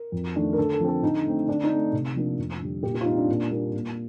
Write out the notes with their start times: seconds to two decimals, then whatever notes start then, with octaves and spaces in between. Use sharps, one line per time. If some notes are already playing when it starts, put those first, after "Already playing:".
Already playing: A#4
0.12 F2
0.35 D#3 A3 D4
0.53 A#4
0.58 D3 A4
0.73 A4
0.80 F3 C4
0.88 A4
1.02 D3 D#4
1.25 A3 C4
1.47 D3 D4
1.64 D#4
1.70 A3 C4
1.93 C3
2.15 F3 A#3 D4
2.38 F2
2.61 D3 G3
2.83 A#2 G4
2.94 G4
3.01 F4
3.05 G3 C4 D#4
3.18 D4
3.29 A#2
3.51 G3 A#3 D4
3.73 A#2